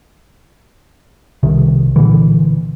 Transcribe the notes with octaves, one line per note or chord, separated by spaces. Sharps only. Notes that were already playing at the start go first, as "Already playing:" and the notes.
C2 C3 D#3
A#2 D3 E3